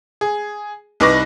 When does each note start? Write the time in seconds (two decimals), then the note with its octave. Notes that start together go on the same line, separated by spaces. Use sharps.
0.21 G#4
1.00 C2 D#4 B4 C#6 D6 A#6